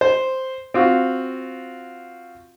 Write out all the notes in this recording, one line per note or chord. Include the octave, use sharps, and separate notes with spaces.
C5
C4 F4 F#4